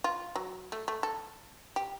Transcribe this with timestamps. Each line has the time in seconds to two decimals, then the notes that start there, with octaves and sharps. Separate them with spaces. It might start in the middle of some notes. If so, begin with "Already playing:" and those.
0.04 F4
0.36 F#3
0.72 A3
0.88 A3
1.03 A4
1.76 G4